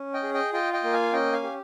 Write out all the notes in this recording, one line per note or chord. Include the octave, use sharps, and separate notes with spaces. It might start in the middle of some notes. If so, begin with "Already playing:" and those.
Already playing: C#4
D#5 G5
G#4
D#5 G5
F4 D#5 G5
D#5 G5
A#3
F5 G#5
C#4 D#5 G5
F5 G#5
G4